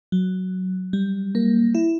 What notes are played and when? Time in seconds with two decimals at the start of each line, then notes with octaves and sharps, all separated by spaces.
0.12 F#3
0.93 G3
1.35 A#3
1.75 E4